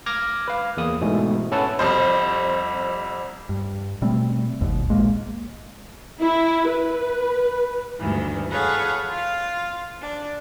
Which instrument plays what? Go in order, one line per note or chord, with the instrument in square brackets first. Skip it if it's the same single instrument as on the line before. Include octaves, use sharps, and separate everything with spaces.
[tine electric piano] D6 F6 G#6 A#6
B4 F5
E2 A#3 D#6
G#2 B2 E3 A3
C#4 A4 B4 C#5 F#5 A5
[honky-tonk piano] C2 F2 C5
[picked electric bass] G2
B2 G3 A3 C4
G1 D#2 B2
A#1 G#3 A#3
[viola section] E4
B4
[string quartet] D2 G2 D#3 E3
G#4 A4 B4 C#5 F5 F#5
F4 F5
D4